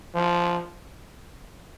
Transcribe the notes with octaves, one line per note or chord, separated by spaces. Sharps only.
F3